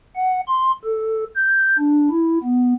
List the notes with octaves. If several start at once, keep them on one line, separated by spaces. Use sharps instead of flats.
F#5
C6
A4
G6
D4
E4
B3